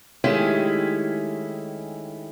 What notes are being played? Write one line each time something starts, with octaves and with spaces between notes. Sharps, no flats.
D#3 G#3 A3 C#4 E4 G4